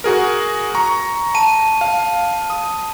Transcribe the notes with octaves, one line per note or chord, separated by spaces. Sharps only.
F#4 G#4 A#4
A#5 C#6
A5 D#7
F5
D#6